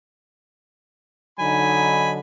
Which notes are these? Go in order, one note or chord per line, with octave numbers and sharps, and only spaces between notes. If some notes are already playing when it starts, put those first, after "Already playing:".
D3 F#3 D#4 G#5 B5